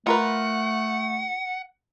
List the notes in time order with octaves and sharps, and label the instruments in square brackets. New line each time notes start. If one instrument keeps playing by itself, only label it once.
[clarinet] A3 [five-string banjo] F4 A#4 B4 [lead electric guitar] F#5